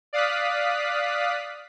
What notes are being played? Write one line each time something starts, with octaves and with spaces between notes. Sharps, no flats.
D5 F5 D#6 F#6 B6